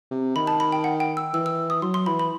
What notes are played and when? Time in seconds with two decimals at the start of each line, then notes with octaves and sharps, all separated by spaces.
0.11 C3
0.36 D#3 B5
0.47 A5
0.60 B5
0.72 G5
0.84 F#5
1.00 G5
1.17 E6
1.33 E3 E6
1.46 E6
1.70 D#6
1.82 F#3 C6
1.94 C6
2.06 E3 B5
2.19 B5